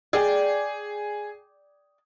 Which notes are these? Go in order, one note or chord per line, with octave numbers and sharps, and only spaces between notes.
G#4 D5 G5